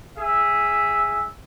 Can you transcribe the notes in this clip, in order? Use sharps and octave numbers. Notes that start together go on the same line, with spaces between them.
G#4 E5